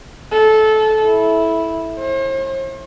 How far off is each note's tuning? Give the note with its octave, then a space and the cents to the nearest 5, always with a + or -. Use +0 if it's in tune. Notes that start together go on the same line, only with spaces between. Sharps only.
A4 -20
E4 -10
C5 +45